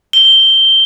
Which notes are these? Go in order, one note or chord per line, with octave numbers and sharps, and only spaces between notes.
G7